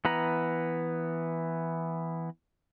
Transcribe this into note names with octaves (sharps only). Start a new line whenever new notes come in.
E3 B3 B4 A#5